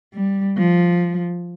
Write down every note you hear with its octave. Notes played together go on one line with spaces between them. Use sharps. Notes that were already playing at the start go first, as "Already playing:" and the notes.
G3
F3